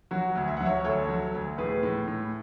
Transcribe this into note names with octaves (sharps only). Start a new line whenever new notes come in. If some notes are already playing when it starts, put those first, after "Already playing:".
F#3 F#4
D2
E5
F#3 F#5
C#5 E5
D2 A4 C#5
F#3
D2
A2 G#4 B4
A2
A2